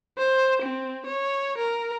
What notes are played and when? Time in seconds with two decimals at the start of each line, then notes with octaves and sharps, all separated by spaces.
0.18 C5
0.62 C4
1.06 C#5
1.57 A#4